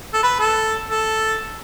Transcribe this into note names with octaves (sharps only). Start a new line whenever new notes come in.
A4
B4
A4
A4